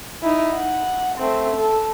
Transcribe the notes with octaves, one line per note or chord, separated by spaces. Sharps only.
D#4 E4
F#5
A3 C4
A4